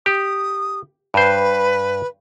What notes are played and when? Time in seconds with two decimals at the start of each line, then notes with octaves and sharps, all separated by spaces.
0.06 G4 D#6
1.14 G2 B4 C5